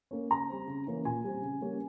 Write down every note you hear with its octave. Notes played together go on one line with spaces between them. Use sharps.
A#3 C#4
C#3 A#5
G3 C4
C#3
E3 A#3 C#4
A#2 G#5
G3 C4
C#3
G3 A#3 C#4